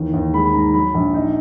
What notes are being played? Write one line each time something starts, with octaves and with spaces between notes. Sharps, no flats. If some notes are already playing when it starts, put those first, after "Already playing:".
Already playing: D#2 E3
D#2
G#3 B5
B5
G#2 A#5
F#3 B5
A#1
D#4